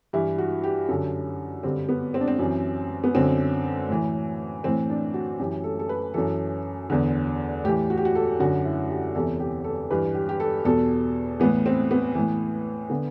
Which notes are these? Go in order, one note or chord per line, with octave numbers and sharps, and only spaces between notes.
G2 E3 E4
F#4
G4
F#2 D3 A4
G2 D3 C4
B3
C4
D4
C4
F#2 E3
B3
F#2 D3 C4
A2 E3
A2 E3 C4
D4
F#4
F#2 E3 G4
A4
A4
B4
F#2 E3 A4
E2 D3
A2 E3 G4
F#4
G4
F#4
A4
F#2 D3 F#4
E4
G4
E2 C3 E3 A4
G4
A4
G2 E3 B4
G4
G4
A4
E2 B2 A4
A2 E3 B3
C4
B3
A2 E3
D3 B3